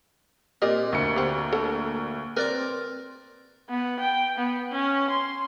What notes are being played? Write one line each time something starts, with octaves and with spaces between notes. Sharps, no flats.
A#2 C4 G4 D5 D#5
D2 A#3 C#7
C4 G4
A4 A5
C4 A#4 B4 D5 D6
B3
G5
B3
C#4
C6